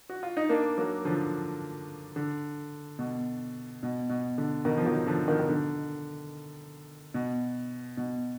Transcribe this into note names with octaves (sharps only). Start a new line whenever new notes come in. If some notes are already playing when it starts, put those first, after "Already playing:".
F#4
F4
D#4
A#3 D4
F#3 A#3
D3 F3
D3
B2
B2
B2
D3
B2 D#3
F3
D#3 F#3
D3 F3
B2 D#3
D#3
D3
B2
B2